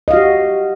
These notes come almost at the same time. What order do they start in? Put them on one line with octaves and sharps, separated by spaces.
D#5 F5 F#4 G4